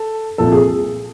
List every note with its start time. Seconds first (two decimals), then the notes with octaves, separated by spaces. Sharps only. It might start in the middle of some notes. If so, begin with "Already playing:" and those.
Already playing: A4
0.38 C2 A#2 F3 A4
0.52 G#4